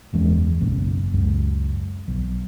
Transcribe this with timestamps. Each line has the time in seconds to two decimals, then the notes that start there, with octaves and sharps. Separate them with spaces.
0.13 F#1 E2 G#3 C#4
0.60 F#1 B1 C#4
1.14 C#2 F#2
2.08 B1